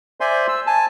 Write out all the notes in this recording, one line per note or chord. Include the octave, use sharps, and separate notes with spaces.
C5 D5 E5 G#5 C6
E6
G#5 A5